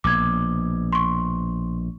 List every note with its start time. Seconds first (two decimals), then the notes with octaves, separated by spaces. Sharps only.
0.04 A#1 B2 D6 G#6
0.93 C6 C#6